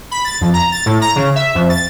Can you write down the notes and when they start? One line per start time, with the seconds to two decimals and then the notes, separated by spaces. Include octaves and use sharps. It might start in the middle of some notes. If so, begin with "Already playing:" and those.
0.11 B5
0.25 A6
0.41 F2
0.53 A#5
0.72 A6
0.86 A2
1.01 A#5
1.16 C#3
1.35 E5
1.55 F2
1.70 A6